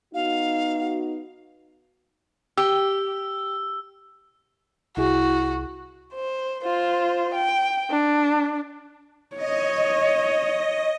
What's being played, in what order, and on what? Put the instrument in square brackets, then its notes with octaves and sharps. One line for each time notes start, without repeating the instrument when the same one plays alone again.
[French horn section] B3 D#4 F#4 [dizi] F5
[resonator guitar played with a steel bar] G4 [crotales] E6
[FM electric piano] C2 E4 G#4 [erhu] F#4
[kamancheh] C5
F4 C5
G5
D4
[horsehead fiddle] C#5 [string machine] D#5